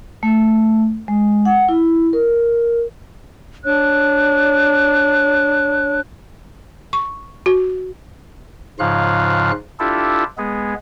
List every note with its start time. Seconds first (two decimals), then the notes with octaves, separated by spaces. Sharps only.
0.23 A3
1.08 G#3
1.45 F#5
1.69 E4
2.13 A#4
3.64 D4 C#5 F#6
6.93 C#6
7.46 F#4
8.79 G#2 C#3 F3 F4 F5 F#6
9.79 D4 E4 F4 G4 A4
10.38 G#3 B3 G#4